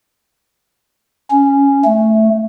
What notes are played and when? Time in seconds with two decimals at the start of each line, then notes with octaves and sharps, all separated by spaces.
1.31 C#4
1.85 A3